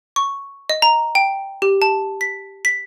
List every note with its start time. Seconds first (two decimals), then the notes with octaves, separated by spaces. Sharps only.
0.16 C#6
0.70 D#5
0.82 A#5
1.15 G5
1.62 G4
1.82 A5
2.21 B6
2.65 B6